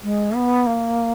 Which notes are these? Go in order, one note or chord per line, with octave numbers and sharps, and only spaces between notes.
G#3
B3
A#3